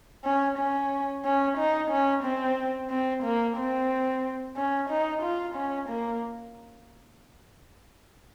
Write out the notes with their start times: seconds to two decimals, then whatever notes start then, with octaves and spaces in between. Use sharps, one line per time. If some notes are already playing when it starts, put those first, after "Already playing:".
0.25 C#4
0.58 C#4
1.25 C#4
1.57 D#4
1.91 C#4
2.23 C4
2.90 C4
3.23 A#3
3.56 C4
4.56 C#4
4.90 D#4
5.23 F4
5.55 C#4
5.89 A#3